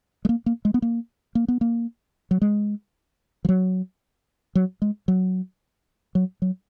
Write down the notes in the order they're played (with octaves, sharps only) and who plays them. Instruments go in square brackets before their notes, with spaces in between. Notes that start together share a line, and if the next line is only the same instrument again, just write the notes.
[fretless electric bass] G#3
A#3
A#3
G#3
B3
A#3
A#3
B3
A#3
F#3
G#3
F3
F#3
F#3
G#3
F#3
F#3
F#3